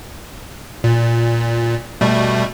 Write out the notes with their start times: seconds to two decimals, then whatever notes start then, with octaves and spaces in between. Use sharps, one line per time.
0.84 A#2
2.01 B2 G3 A3